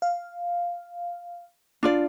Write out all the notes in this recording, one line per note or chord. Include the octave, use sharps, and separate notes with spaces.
F5
D4 F4 D5